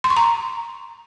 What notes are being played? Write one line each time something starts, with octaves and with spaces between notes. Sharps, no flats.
C6
C#6
A#5